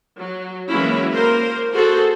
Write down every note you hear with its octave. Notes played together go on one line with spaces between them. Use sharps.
F#3
E3 F#3 G#3 A#3 C#4 E4
A#3 A#4 C5
F#4 G#4 A4 C5